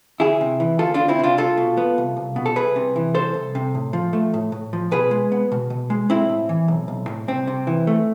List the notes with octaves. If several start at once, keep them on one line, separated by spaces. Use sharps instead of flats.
D2 E4 G#4
C3
E3
D2 F4 A4
D2 D4 F4
C4 E4
C3 D4 F4
C2 F4 A4
B2
B3
C2
C2
B2
A4
C2 G#4 B4
C3
E3
C2 A4 C5
C2
C3
A2
F3
A3
A2
A2
F3
B2 G#4 B4
G#3
B3
B2
B2
G#3
B1 C4 E4
A2
E3
B1
B1
A2
C2 C4
C3
E3
A3